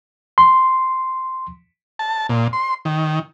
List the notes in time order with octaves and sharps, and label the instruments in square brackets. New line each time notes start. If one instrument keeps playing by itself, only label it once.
[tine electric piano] C6
[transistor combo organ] A5
A#2
C6
D#3